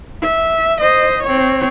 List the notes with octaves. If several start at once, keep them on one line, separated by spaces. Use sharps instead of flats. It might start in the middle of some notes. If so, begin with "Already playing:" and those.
E5
C5 D#5
C4 C#5